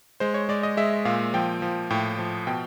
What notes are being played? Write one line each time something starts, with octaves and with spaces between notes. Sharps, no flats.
G#3 C5
C#5
G#3 D5
D#5
G#3 E5
A#2 F5
F3 G5
F3
A2 G5
F3
B2 G5